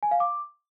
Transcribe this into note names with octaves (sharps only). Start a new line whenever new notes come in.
G#5
F5
D6